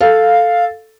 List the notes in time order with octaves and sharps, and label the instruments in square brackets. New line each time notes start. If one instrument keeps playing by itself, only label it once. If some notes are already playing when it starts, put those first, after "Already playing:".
[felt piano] A4 [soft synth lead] F5